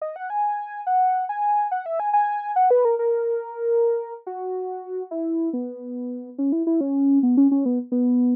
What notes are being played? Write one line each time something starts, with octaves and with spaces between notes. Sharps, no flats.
D#5
F#5
G#5
F#5
G#5
F#5
E5
G#5
G#5
F#5
B4
A#4
A#4
F#4
E4
B3
C#4
E4
E4
C#4
B3
C#4
C#4
B3
B3